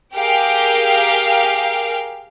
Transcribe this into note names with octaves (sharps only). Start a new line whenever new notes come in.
G4 G#4 A#4 F5 G5